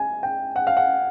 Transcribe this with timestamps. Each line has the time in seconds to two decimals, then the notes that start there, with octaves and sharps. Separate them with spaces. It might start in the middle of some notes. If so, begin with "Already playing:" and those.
Already playing: G#5
0.23 G5
0.56 F#5
0.67 F5
0.77 F#5